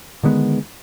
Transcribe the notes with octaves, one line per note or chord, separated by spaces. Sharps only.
D3 D#3 G#3 B3